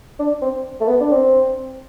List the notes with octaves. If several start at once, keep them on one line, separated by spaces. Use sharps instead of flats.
D4
C4
A3
B3
D4
C4